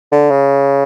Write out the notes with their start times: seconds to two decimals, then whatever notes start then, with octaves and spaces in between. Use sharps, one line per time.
0.12 D3
0.31 C#3